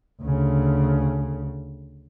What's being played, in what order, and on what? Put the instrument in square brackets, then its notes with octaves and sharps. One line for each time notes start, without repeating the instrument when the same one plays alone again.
[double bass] D2 C#3